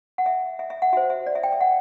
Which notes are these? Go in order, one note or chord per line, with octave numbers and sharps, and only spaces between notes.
F#5
E5
E5
E5
F#5
F#4 C5 E5
E5
D5
E5
G5
E5
F#5